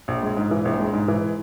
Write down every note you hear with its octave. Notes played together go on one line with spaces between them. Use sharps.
A#1
G#3
G#2
E3
A#1
G#3
G#2
E3